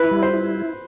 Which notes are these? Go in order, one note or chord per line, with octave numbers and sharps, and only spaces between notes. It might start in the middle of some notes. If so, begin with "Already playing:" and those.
Already playing: E4 B4
G3
C5
E4